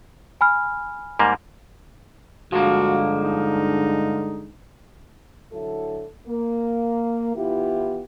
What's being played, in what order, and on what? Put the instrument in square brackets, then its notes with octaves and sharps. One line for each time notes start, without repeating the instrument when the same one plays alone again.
[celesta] G#5 B5 F6
[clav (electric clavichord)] G#2 G3 A#3
[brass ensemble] G2 D3 G#3 [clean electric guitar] F3 A#3 [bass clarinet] F#4
[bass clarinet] D#4
[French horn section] D3 F#3 E4 A4
A#3
E3 B3 E4 F4 G4